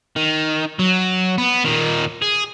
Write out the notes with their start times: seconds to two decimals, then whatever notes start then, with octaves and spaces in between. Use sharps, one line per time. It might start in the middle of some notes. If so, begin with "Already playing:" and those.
0.16 D#3
0.79 F#3
1.38 B3
1.65 A#2 D#3
2.22 G#4